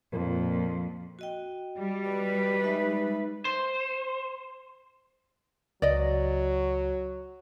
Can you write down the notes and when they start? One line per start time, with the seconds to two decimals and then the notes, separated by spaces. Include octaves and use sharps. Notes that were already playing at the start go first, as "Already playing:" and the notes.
0.13 F2 A#2
1.19 F#4 D#5 G5
1.78 G3
2.09 B4
2.64 G#3 D#4 E5
3.45 C5
5.82 C#2 C#3 F#3 D5 D#5